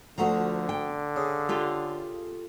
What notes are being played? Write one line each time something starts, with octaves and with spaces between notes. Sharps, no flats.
D2 D3 F3 A3 F#4 A#5
G5
C#3
F4 G4 A4